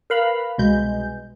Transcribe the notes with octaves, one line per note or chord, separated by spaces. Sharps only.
A#4 B4 F5 B5
C2 B2 G#3 G6